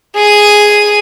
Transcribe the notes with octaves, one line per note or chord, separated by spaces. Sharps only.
G#4 D#7